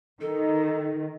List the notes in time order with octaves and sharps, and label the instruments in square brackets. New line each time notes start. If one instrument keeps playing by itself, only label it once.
[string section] D#3 [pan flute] A4